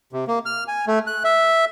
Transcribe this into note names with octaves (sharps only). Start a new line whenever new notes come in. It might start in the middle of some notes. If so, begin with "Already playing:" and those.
C3
A#3
F6
G#5
A3
F#6
E5